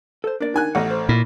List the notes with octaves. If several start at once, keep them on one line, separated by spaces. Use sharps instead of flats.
A4 C5
A#3 D4 D5
D#3 G#5 F#6
A1 A3 D#5 F#5
C5
A#2 E4